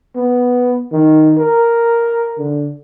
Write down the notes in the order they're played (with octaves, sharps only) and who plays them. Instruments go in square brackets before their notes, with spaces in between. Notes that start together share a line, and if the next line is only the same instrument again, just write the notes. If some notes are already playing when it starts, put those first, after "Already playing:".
[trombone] B3
D#3
A#4
D3